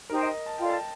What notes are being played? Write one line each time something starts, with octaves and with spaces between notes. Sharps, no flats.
D#4 G4 A#4 C5 G5
D#5
A5
F4 A4 D5 F5 G5
A5